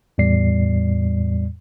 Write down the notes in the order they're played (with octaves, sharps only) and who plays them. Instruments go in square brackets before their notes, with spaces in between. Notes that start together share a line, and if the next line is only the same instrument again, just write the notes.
[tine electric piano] E2 A2 G3 D5 C7